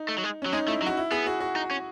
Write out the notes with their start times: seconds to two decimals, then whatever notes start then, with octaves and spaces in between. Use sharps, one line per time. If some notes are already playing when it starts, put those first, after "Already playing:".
Already playing: D#4
0.09 A3
0.18 F#3
0.24 G#3
0.42 F#3 C#4
0.53 G#3 D#4
0.67 A3 E4
0.82 F#3
0.86 F#4
0.97 E4
1.11 B3 G#4
1.27 F#4
1.40 F#4
1.56 D#4
1.71 C#4